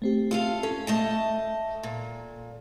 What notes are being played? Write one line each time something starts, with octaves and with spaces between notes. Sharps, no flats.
A3 C4 G4
F4 A4 F5
C#4 A4
A3 D#5 A5
A#2